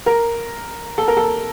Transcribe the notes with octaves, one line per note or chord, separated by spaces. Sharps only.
A#4
A4
A#4
A4